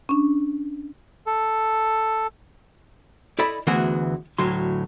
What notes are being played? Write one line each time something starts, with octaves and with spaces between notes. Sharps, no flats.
C#4 D4
A4
E4 A4 D5 D#5 B5
D2 E3 B3 F#4 G#4
D2 A2 F#3 C6